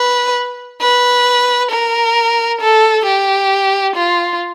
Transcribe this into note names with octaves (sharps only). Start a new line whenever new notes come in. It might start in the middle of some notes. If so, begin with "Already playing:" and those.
Already playing: B4
B4
A#4
A4
G4
F4